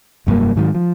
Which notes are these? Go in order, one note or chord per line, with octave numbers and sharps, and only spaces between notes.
F1 G2 F#3 A#3
G#2 D#3 E3 F#3
F3